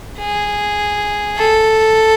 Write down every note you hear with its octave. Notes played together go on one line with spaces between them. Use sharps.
G#4
A4